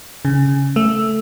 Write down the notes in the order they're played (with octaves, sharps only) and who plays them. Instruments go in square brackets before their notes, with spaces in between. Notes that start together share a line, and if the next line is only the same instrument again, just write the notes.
[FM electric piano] C#3
A3